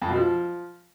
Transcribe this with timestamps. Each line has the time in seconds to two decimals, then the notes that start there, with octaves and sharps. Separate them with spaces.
0.02 F2
0.09 B2
0.16 F3